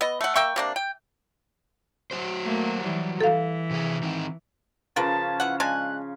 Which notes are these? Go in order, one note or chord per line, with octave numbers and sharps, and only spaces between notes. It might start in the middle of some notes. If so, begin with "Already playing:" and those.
B3 D#5
A3 F#5
A#3 E5 G5 C#6
C3 A#3 D4
G5
F#3 F#4 C5
A3 A#3
E3 G3
E3 A4 F5
C3 G#4
D#3 C4 D#4
C#3 F3 C#4 F4 A#4 B4 A5
E3 F#5
G#3 D4 G#5 F#6